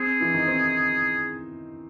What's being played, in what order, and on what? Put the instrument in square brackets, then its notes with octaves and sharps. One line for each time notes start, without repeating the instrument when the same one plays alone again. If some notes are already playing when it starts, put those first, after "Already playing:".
Already playing: [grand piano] C4 C5 [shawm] G#4
[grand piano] E3 E4
D#3 D#4
C4